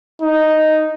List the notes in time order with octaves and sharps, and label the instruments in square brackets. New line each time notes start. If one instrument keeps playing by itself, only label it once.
[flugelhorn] D#4